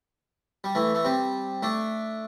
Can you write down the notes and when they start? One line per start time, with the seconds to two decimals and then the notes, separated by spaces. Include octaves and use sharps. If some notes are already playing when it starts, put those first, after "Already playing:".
0.64 G3
0.75 E3 A3
0.95 A3
1.05 G3 C4
1.63 A3 D4